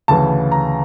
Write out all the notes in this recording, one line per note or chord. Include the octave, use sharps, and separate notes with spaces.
D2 C#3 E3 A5
A#5